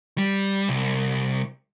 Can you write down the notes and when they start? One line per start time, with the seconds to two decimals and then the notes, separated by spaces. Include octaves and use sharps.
0.18 G3
0.69 C2